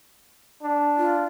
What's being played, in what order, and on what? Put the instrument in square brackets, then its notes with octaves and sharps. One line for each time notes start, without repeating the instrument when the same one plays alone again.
[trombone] D4
[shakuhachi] F4